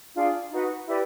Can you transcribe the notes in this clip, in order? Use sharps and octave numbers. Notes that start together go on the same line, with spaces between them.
D4 F4 G#4
D#4 F#4 B4
E4 G4 B4 D5